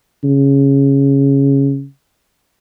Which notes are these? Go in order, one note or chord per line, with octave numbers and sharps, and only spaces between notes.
C#3